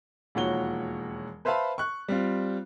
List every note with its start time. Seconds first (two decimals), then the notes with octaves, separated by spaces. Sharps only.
0.35 E1 D#2 F3 F#4 C#5 G7
1.45 B4 C5 E5 F5 A5 B5
1.78 C#6 F#6
2.08 G3 C4 F4